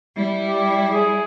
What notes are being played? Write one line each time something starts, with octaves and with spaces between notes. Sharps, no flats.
G3 E4
G4
G#4